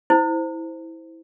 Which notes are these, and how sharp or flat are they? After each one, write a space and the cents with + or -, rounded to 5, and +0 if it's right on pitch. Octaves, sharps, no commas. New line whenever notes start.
E4 -15 C5 -10